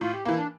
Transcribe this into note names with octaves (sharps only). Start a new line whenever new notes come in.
A2 F4
G4
E3 A#3 E4
D4